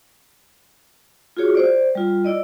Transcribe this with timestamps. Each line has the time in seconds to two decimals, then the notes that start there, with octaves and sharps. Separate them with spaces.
1.37 F4 F#4 G#4 C#5
1.55 C5 D5
1.95 G3 F4
2.24 E4 D5 D#5